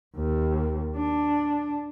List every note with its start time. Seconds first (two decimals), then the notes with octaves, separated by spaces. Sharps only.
0.16 D#2
0.96 D4